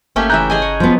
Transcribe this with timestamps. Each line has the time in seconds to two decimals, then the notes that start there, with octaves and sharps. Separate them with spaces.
0.16 G1 A3 A#3 C#4 G4 E5
0.30 C#3 E3 E5 A#5 F#6 G6
0.50 G#4 D#5 G#5
0.62 C#5
0.80 F3 B3